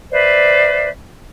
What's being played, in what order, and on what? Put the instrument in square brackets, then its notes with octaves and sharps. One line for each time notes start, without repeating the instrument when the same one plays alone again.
[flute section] B4 C5 D5 E5